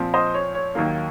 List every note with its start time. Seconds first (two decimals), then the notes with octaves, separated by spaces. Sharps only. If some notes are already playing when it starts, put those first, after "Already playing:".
Already playing: A#2 F3 C4
0.14 C5 D#5
0.34 C#5
0.55 C#5
0.75 D#2 D#3 F#3 A#3